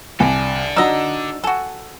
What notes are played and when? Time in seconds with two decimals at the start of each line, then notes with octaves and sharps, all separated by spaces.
0.20 C2 A4 D5 G#5 A5
0.76 D4 D#4 F#4 D#5 A#5 E6
1.44 F#4 A4 G#5